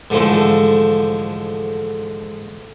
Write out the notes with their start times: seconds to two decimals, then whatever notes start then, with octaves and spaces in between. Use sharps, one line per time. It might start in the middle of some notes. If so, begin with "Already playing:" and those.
0.10 G#2 D3 E3 F3 A3